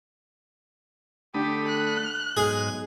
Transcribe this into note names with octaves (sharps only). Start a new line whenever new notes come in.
D3 A3 G4 B5 D#6
F#6
B1 G#2 G#4 D#5